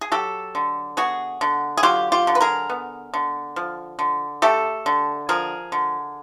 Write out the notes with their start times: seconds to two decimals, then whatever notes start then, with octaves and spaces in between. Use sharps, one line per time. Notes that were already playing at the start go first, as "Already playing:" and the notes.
0.01 G#4
0.12 F#3 G4 A4
0.55 D3
0.97 B3 F#4 G#4
1.41 D3
1.77 G#4
1.83 F#3 F4 G4
2.12 F4 G4
2.27 D3
2.35 B4
2.41 G#4 A#4
2.69 B3
3.14 D3
3.56 F3
3.99 D3
4.42 A3 G4 A4
4.86 D3
5.29 F3 G#4 A#4
5.72 D3